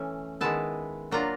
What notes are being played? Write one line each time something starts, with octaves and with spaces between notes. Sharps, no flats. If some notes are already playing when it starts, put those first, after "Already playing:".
Already playing: E3 A3 C#4
D#3 G#3 B3 E4 A5
F#3 A#3 D4 F4 A#5